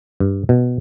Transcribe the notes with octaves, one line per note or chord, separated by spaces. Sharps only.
G2
B2